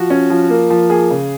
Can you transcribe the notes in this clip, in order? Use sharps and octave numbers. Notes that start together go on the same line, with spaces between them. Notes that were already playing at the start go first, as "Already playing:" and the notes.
Already playing: F3 F#4
C#4
F3
A#3
F3
A#3 G#4
C#3